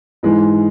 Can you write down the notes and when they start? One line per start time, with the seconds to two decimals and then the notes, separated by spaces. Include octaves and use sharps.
0.23 G#2 E3 G#3